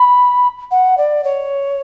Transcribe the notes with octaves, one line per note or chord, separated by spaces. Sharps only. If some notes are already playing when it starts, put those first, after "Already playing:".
Already playing: B5
F#5
D5
C#5